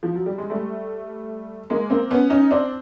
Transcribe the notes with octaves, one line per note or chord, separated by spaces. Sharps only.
F3
F#3
G3
G#3
G3 A3
G#3 A#3
A#3 C4
B3 C#4
C#4 D#4
C4 D4